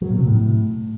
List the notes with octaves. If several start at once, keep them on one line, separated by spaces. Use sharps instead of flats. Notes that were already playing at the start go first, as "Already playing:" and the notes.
F#3
A#2
C3
A2